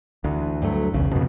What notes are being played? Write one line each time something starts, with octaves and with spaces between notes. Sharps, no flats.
D2 E3
G2 F#3 A3
B1 E2 C#3
F2 B2